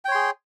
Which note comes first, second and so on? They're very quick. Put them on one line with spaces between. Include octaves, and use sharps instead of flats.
G5 C#5 C6 G#4